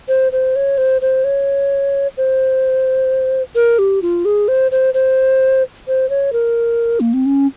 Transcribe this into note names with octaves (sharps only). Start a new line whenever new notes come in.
C5
C5
C#5
C5
C5
C#5
C5
A#4
G4
F4
G#4
C5
C5
C5
C5
C#5
A#4
A#3
C4
C#4